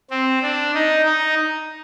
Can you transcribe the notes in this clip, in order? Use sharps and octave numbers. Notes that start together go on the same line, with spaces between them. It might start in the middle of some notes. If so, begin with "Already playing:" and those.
C4
D4
D#4
D#4